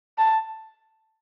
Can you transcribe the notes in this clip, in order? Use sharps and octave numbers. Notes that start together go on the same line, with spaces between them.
A5